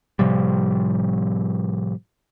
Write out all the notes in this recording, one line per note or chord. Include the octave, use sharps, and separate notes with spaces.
A2 C3 F3 G3